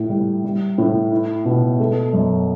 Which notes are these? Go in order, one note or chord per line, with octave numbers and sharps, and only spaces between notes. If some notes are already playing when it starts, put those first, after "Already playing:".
Already playing: A2
G3
G3
A2
E4
B2
A3
F#2